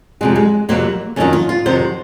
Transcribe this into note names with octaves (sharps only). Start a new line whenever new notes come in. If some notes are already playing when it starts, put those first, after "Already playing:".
F2 C3 F#3 G#3
G#3
F2 C3 F#3 A#3
F2 C3 D#3 F#3 C#4
F4
F4
F2 C3 D#3 F#3 C5